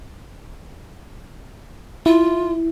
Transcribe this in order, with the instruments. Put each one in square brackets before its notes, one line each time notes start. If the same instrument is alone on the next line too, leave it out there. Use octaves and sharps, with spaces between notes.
[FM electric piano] E4 [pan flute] F4